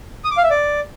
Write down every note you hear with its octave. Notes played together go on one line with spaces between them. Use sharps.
D#6
D6
F5
E5
D5